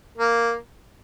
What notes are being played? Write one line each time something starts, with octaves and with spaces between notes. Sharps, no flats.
A#3